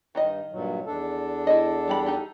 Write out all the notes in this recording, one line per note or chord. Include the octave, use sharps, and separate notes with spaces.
G2 D#3 D#4 D#5
G2 A#2 F#3
E2 D4 A4
E4 D#5
G3 G4 B5
D#4 G4